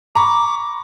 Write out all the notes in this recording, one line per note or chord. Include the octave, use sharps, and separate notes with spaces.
A#5 B5 C#6 D6